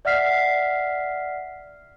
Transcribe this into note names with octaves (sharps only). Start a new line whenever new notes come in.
D5 E5 F#5 F6 B6 C7